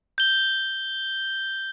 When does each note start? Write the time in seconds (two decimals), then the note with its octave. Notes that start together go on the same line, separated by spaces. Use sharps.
0.18 G6 G7